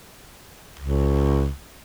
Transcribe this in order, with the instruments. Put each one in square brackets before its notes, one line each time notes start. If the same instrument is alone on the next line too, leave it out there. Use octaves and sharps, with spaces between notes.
[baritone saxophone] C#2